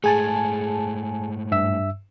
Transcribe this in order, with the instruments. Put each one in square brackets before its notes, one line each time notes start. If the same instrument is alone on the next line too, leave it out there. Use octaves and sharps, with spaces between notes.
[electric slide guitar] G#2 A3 [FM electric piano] G#4 G#5 A5
[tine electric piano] G2 E5 E6